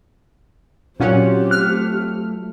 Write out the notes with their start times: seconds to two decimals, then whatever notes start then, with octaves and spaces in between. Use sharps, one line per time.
1.00 A#2 F#3 C4 C#4 F4 G4 F#5
1.51 A3 F6 F#6